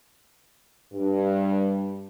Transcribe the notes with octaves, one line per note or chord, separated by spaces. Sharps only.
G2